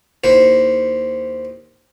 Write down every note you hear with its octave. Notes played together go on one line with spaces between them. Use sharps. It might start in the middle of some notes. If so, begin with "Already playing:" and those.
D#2 E4 C5